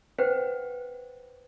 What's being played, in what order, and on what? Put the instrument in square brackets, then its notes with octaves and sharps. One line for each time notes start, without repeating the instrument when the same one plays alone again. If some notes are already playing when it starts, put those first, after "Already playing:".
[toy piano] B4 C5 F#5 G5